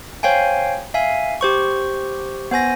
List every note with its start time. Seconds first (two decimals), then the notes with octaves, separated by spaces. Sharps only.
0.23 C5 C#5 F5 G5 G#5
0.94 E5 F5 G#5
1.41 G4 C5 C#6
2.51 B3 C5 G#5 A#6